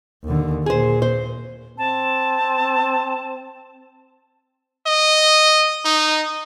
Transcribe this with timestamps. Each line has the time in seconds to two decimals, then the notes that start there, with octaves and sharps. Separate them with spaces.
0.24 D#2 D3
0.66 A#2 G#4 C5
1.02 C5
1.78 C4 A5
4.87 D#5
5.85 D#4